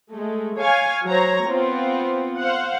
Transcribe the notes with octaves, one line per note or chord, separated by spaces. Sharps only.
G#3 A3
C#5 F5 G#5
F#3 C5 C#5 A#5
B3 C4 F4
C5 F5 F#5